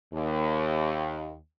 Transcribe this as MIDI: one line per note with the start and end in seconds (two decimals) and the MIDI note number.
0.13 1.35 39